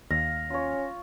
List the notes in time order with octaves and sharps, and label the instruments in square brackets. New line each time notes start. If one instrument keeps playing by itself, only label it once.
[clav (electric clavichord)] D#2 [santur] F5 [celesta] A#6
[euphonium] C#4 [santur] F4 C#5